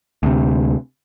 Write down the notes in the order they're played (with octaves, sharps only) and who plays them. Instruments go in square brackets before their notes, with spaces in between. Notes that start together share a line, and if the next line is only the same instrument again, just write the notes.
[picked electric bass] D2 C3